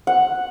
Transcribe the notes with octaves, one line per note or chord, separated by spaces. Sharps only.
F#5